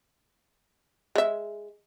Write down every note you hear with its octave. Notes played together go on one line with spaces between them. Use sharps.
G#3 E5